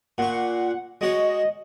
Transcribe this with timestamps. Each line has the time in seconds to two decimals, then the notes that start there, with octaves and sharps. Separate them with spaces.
0.18 A#2 F#5 C#6
1.01 G#3 F#4 C#5 D#5